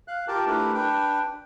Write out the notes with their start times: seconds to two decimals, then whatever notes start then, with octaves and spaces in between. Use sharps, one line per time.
0.08 F5 F#6
0.28 F4 G4 A#4 G5 A5
0.46 A3 D4 E4 G4 A#4 B4
0.74 D4 B4 G5